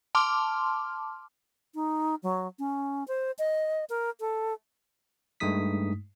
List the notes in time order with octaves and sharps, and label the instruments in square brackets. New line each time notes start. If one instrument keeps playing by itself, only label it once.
[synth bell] A5 C6 D6 F6
[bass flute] D#4
F#3
C#4
C5
D#5
A#4
A4
[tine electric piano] G2 G#3 A3 D#4 D#6 B6